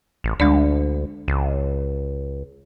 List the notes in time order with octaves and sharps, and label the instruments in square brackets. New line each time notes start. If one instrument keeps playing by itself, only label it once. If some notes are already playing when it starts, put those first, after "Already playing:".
[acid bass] A1
[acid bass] D2 [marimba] G#3 D4 D5
[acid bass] C#2